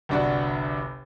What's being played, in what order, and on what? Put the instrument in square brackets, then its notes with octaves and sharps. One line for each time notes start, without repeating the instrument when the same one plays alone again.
[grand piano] G1 C2 D4 F#4 D5